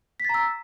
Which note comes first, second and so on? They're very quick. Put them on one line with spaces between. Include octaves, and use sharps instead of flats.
B6 A6 A#5 E6